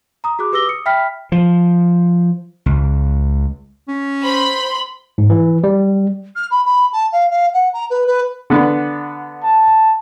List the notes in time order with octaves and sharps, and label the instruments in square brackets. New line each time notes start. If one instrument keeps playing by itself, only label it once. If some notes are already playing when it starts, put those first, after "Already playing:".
[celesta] A#5 D#6
F#4 G#4 D6 F#6
G4 B4 D6 E6 A#6 G7
D#6 C#7
E5 G5 B5 F6 B6
[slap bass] F3
C#2
[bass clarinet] C#4
[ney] C5 [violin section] B5 [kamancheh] C6
[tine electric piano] G#2
E3
G3
[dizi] F6
B5
B5
A5
F5
F5
F#5
A#5
B4
B4
[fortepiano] D3 B3 D4
[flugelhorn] A5